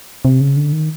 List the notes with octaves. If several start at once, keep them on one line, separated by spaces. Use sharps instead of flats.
C3
C#3
D3
D#3